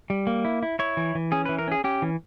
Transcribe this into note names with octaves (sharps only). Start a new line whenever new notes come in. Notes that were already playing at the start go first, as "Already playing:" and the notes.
G3
A#3
E4
E4
E4 C#5
E3
E3
C#4 G#4
E3 B4
A#4
C#4 G#4
C#4 G4
E3